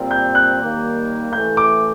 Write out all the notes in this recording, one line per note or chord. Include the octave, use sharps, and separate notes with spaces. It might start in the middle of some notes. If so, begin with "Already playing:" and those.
Already playing: A#2 G3 C4
G6
F#6
D#2 D#3 G3 A#3
A1 A2 E3 A3 G6
D6